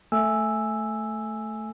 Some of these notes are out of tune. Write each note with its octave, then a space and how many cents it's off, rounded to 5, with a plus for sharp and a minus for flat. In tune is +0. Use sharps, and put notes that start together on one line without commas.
A3 +0 G#5 +0 E6 +0